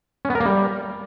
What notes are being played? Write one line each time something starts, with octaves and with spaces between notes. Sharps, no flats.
C#4
B3
A#4
A#3
G3